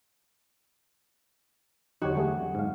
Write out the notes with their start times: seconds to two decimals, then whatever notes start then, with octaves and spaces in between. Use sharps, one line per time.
2.02 E2 D3 F#3 D#4 F#4 G4 C#5
2.15 G3 A3 G#4
2.37 F#3 C4
2.55 G#2 F5